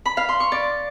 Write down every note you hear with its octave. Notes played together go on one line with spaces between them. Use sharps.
B5
F5
C6
C#6
D5